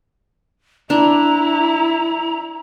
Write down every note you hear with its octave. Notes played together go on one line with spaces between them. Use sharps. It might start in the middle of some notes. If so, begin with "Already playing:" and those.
D4 E4 A#5